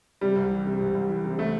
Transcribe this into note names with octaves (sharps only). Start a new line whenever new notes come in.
C3 G3
C2
E3
C3
C2
C2
E3
C3
C3 A3